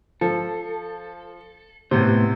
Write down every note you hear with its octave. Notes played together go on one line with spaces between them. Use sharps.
F3 A4
A2 C3 B3 C5